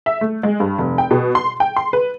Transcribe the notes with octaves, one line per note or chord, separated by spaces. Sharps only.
E5
A3
G#3
G2
F1
G5
B2
C6
G5
C6
B4